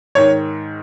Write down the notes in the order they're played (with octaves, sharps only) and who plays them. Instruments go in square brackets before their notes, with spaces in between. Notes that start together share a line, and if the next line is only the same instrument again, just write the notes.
[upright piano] G#2 D#3 C#5